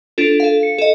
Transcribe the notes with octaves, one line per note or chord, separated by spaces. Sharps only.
D4 F4 A4
A4 F5
C#7
A4 D#5